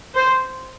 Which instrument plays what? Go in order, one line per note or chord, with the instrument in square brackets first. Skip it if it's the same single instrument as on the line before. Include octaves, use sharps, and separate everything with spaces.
[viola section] C5